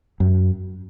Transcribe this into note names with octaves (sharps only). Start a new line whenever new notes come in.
F#2